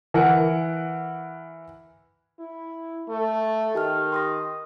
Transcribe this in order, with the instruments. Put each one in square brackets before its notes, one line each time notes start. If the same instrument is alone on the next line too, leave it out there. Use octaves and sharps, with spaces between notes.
[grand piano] E3 A#4 F#5
[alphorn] E4
A3
[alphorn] D#3 [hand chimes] G4 A5 F6
[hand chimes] C6 D#6 A#6